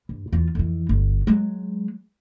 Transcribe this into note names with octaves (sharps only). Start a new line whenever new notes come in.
G2
E2 F4
F2 E3
G1
F#3 G#3